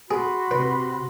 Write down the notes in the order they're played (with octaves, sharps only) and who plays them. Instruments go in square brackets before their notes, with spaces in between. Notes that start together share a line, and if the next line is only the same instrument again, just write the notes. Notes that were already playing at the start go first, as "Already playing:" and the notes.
[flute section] F#4 B5 C6 [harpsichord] G#4
[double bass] C3 [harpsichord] B4